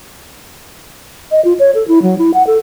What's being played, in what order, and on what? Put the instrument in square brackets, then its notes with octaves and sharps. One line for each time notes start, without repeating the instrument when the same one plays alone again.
[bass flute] D#5
F4
C#5
A4
E4
F#3
E4
F#5
A4